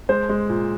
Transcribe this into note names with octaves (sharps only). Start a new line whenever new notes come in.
G#3 C5
G#3
A#2